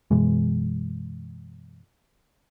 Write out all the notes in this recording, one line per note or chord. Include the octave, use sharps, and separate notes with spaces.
F#2 B2 E3 G#3